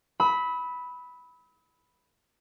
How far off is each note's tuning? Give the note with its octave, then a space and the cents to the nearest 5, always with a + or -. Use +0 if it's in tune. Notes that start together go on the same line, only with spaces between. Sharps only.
B5 +0 E6 -40